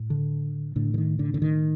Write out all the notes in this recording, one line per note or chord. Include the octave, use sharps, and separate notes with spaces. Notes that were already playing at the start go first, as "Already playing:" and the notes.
Already playing: A2
D3
A2 D3
D3
D#3
D3
D3
D#3